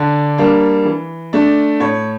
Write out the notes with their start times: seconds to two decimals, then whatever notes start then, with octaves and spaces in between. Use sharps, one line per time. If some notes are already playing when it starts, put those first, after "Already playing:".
Already playing: D3 D5
0.38 G3 A#3 D4
0.85 E3
1.33 A3 D4
1.80 A2 C#5